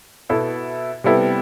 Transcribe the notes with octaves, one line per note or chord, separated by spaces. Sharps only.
B2 B3 E4 A4
C3 G3 B3 E4 A4